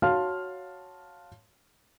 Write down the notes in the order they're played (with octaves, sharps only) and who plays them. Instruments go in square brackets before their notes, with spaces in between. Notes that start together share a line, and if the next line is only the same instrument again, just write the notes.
[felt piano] F#4 C#5 F5 A5 C6 F6